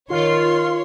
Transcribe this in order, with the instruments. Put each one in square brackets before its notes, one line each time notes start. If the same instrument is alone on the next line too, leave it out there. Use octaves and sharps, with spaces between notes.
[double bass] D#3 [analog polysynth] F4 [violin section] C#5 [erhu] C6